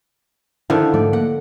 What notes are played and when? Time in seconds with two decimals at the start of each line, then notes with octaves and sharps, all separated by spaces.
0.70 D3 D#3 F3 E4
0.94 G#2 F3 A3 D5
1.13 A#3 F#5